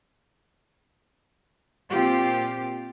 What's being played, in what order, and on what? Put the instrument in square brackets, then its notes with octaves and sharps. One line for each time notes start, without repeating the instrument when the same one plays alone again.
[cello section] A#2 C4 F4 G4